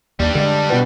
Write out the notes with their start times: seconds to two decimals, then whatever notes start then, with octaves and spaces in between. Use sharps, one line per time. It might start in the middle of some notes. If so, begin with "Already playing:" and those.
0.20 D#2 G3 D4
0.35 D3 G#3
0.70 B2 B3